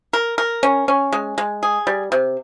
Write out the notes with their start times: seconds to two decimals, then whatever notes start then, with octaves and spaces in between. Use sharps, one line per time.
0.13 A#4
0.38 A#4
0.63 C#4
0.88 C#4
1.12 G#3
1.38 G#3
1.63 G#4
1.87 G3
2.12 C3